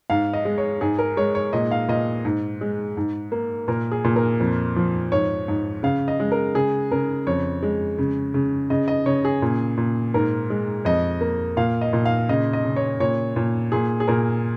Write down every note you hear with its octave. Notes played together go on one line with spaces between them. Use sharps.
G#2 F5
D#5
G#3
C#5
G#2 G#4
A#4
G#3 C#5
C#5
A#2 D#5
F5
A#2 D#5
G#2
G#3
G#2
A#3
A#2 A#4
G#4
A#2
A#4
F2
F3
G#2 C#5
G#2
C#3 F5
D#5
G#3
A#4
C#3 G#4
C#3 A#4
F2 C#5
G#3
C#3
C#3
C#3 D#5
D#5
C#3 C#5
G#4
A#2
A#2
G#2 A#4
G#3
F2 D#5
A#3
A#2 F5
D#5
A#2
F5
C#3 D#5
D#5
C#3
C#5
A#2 C#5
A#2
A#2 G#4
G#4
A#2 A#4